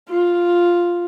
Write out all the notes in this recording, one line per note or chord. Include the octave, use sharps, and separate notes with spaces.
F4